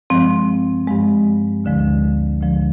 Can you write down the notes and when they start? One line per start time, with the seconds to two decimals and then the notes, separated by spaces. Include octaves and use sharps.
0.10 G2 F3 G#3 C4
0.88 G2 F3 G#3
1.64 D2 D3 F3 G#3
2.41 D2 D3 F3 G#3